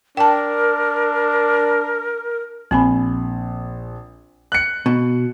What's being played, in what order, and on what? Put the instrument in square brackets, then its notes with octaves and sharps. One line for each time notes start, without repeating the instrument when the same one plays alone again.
[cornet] D4 [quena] A#4 [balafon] G5 A5
[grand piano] A#1 [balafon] C4 G#5 B5
[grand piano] F#6 C#7
[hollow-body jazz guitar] B2